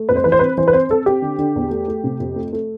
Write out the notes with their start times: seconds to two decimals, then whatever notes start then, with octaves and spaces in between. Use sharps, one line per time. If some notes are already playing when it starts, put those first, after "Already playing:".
Already playing: A3
0.09 F2 B4
0.16 C5
0.24 E3 B4
0.32 C5
0.39 C4 B4
0.57 E3 C5
0.68 B4
0.73 C4 C5
0.89 C4 A4
1.06 C4 G4
1.22 D3
1.39 D3
1.56 E2
1.71 A3
1.88 A3
2.04 C3
2.20 F2
2.36 A3
2.53 A3